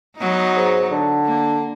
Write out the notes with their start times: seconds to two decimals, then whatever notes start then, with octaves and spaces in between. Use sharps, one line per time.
0.17 F#3 B3 D#4
0.56 G#2
0.91 D3
1.25 A#3